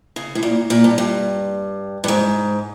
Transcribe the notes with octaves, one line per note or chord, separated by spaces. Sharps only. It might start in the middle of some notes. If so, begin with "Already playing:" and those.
C#3
A2
A#2
A#2
G2
G2
G2
G#2